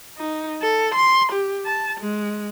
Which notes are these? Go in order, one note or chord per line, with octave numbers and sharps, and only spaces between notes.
D#4
A4
C6
G4
A5
G#3